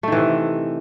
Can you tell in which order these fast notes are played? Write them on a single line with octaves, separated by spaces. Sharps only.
A3 D#3 E3 C3